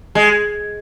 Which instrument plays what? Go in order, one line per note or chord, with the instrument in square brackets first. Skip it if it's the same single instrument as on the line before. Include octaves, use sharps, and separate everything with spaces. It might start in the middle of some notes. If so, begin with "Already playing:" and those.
[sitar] G#3